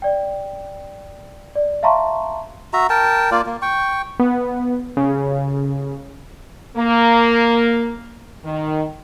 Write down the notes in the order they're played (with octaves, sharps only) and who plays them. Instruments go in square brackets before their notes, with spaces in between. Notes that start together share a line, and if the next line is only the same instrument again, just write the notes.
[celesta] D5 G5
D5
E5 F5 A5 A#5 C6 C#6
[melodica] F#4 E5 A#5
A#4 G5 A5
A#3 F4 D5
A#3
G5 C#6
[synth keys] B3
C#3
[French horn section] A#3
D#3